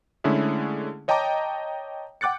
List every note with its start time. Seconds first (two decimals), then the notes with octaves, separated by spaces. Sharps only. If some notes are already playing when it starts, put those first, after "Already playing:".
0.24 D3 G#3 A3 C#4 E4 G#4
1.08 C#5 D#5 G5 A5 A#5 D6
2.21 F#5 G5 D6 F#6 A6 C#7